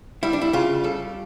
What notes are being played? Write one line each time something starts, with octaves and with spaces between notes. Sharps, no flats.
G3 E4
D4
E4
C#3 F4
G3 A4